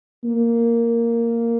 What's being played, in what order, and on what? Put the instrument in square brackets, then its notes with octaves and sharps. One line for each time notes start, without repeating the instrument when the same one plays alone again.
[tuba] A#3